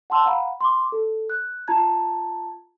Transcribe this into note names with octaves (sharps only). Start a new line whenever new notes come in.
F#5 A5 C6 E6
F5 F#5 A#5 B5
C6 D6
A4
F#6
F4 A5 A#5 G#6